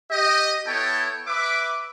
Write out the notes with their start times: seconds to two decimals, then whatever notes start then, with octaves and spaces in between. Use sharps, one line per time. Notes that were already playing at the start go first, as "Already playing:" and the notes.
0.11 G4 D#5
0.66 B3 E4 A4 C#5 G5 A5
1.27 B4 E5 B5 D6